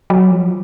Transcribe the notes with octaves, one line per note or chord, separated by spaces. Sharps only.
F#3
F3